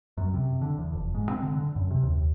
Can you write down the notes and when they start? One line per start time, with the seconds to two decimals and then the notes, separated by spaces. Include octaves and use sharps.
0.17 F#2
0.34 C3
0.62 D3
0.78 E2
0.93 F1
1.14 G#2
1.30 C4
1.42 D3
1.55 D3
1.76 F#2
1.91 C3
2.03 D#2